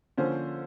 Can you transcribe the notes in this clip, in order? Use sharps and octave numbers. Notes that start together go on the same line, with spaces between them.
D3 F3 A#3 C#4 C5